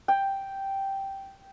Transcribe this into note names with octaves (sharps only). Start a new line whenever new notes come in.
G5